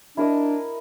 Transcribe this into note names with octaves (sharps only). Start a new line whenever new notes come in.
D4 E4 A#4 D#5